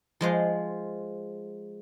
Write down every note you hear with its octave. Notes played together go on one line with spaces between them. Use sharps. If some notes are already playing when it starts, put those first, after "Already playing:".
F3 G#3 C5